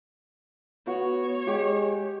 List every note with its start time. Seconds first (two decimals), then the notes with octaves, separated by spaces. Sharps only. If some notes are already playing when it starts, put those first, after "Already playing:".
0.87 B3 F#4 C#5 F#5
1.47 G#3 G4